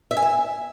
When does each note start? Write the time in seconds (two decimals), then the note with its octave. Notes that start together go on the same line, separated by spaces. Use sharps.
0.11 E5
0.17 G#5
0.22 E5